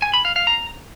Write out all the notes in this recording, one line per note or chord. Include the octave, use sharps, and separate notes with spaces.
G#5
B5
F5
F5
A#5